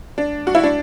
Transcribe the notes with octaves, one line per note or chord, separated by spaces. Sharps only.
D4
F#4
E4
D4